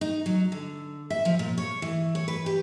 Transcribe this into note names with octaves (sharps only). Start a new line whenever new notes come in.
D#4
F#3
D3
E5
F3
A#2
C#5
E3
C#5
B4
G4